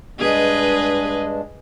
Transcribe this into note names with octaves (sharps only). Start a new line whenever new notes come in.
G2 G#3 D4 G#4 B4 D#5